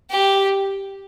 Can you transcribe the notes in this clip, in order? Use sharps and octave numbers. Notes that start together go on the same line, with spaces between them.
G4